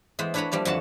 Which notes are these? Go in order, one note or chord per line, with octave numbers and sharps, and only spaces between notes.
E3 G#3 B3 C5
D4 E4 B4 C#5 A#5 B5
F3 G3 A#3 D5
F2 D3 E3 F#4 F#5 A5